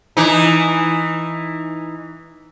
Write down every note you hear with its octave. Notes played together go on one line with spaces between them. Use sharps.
E3 D#4